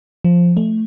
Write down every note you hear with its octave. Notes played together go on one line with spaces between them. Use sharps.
F3
A3